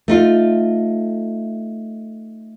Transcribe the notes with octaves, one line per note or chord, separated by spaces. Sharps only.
A3 D#4 F4